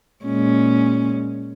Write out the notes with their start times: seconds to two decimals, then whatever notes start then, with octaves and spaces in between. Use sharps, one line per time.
0.25 A#2 G#3 C#4